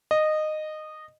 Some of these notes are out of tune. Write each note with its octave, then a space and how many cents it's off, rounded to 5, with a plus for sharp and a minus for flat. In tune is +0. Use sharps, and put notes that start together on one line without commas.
D#5 -15